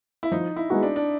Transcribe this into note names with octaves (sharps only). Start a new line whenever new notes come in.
E4
F3 D#4
E4
G#3 B3 D#4 F#4
D4
D4